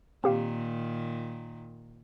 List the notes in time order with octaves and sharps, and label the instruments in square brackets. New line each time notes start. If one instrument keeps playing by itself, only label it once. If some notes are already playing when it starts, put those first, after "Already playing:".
[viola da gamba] A#2 D#3 [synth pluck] C4 G4 F5